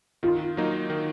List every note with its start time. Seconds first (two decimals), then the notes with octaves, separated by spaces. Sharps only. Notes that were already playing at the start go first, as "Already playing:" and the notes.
0.23 D#3 F4
0.57 F#3 A#3 D#4
0.90 D#3